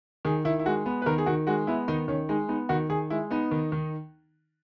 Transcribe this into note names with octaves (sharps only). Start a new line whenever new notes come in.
D#3 G#4
D#3 E4
E4
G#3 F#4
B3
B4
D#3 A#4
G#4
D#3 F#4
G#3 F#4
B3 E4
D#3 D#4
D#3 C#4
G#3 D#4
B3 D#4
D#3 F#4
D#3 G#4
G#3 E4
B3 D#4
D#3
D#3